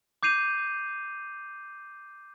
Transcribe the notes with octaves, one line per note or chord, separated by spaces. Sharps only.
D6 G6 C7 D#7 F7